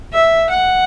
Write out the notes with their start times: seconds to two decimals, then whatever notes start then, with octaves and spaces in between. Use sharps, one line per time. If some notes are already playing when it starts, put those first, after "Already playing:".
0.13 E5
0.49 F#5